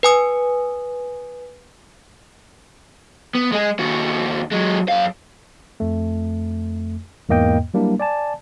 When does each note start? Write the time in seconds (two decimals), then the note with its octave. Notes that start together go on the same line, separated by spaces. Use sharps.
0.03 B4 G#5 D#6
3.35 B3
3.52 G#3 G#4
3.79 D#2 F#4
4.52 F#3 G#3
4.88 F#2 F5
5.80 F2 A3
7.29 E2 G#2 A#3 D#5 G5
7.74 F#3 G3 A#3 D4 E4
8.00 D5 G#5 A5